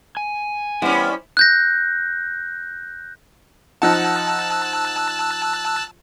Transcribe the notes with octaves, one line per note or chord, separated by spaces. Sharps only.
G#5
E3 G3 B3 C#4 E4 C5
F#6 G6 A#6
F3 D#4 F#5 A5 E6 F#6